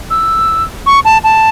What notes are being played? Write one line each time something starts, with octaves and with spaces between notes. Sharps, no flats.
E6
C#6
A5
A5